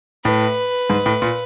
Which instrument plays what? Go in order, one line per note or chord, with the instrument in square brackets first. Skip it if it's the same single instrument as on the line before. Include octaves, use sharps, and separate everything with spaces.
[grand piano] A2 [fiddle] B4
[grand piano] G#2
A2
A#2